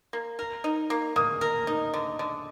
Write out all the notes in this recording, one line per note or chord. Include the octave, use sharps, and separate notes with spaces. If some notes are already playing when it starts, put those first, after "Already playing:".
A#3
A#4
D#4
A#3
A#3 D#6
A#4
D#4
D3
D3